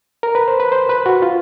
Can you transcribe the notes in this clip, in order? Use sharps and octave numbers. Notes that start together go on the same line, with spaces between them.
A#4
B4
C5
B4
C5
B4
F#4
F4